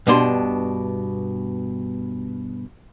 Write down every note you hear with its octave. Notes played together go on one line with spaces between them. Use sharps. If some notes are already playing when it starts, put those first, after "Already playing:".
G2 B2 D4 C6